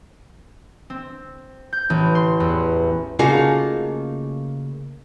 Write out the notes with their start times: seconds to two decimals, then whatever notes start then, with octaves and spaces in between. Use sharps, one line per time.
0.90 C4
1.73 G6
1.90 A1
2.15 C6
2.40 E2
3.19 C#3 A3 A#3 D#4 F4 F#4